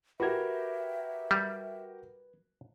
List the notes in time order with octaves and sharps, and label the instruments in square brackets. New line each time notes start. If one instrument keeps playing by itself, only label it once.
[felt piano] F#4 G4 A#4 [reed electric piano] B4 G#6 [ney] E5
[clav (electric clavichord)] G3